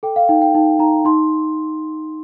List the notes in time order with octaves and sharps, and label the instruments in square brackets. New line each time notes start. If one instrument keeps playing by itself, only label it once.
[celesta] A4 G5
F5
D#4 G5
G5
D#4
D#4 A#5
D#4 C6